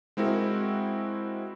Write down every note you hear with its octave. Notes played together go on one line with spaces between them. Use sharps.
G#3 C4 E4 F#4 A#4